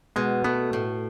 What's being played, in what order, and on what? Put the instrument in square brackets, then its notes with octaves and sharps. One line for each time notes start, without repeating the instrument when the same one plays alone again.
[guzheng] B2 [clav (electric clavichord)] G#3
[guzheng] A3 [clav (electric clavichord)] B3
[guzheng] A2